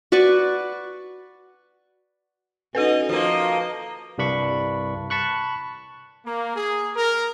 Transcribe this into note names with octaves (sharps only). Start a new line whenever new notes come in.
F#4 B4 D5 C#6
C#4 D#4 F#4 A4 B4 D#5
F3 A#3 D#5
C2 G2 D4 B5 C#6
A5 B5 C#6 F#6
A#3
G#4
A#4